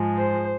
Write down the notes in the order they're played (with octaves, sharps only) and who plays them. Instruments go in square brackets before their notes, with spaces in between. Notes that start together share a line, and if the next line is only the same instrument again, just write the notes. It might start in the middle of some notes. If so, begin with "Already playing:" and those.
Already playing: [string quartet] G#2 F3 G#3
C5